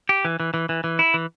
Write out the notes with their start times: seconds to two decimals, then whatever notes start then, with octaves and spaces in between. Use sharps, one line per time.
0.09 G4
0.25 E3
0.40 E3
0.54 E3
0.69 E3
0.84 E3
0.99 E4
1.14 E3